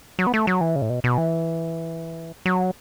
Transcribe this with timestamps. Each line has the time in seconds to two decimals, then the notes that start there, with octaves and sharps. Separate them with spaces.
0.19 F#3
0.27 B3
0.34 A3
0.47 F#3
0.61 E3
0.76 C#3
0.82 A2
0.90 B2
1.04 B2
1.18 E3
2.46 F#3